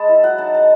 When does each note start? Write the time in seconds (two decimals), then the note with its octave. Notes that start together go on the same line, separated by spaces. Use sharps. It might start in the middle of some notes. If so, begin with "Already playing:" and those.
Already playing: G#3 A5 B5
0.09 E4
0.23 F#3 F#5
0.38 D#4 A5
0.53 G#3 A5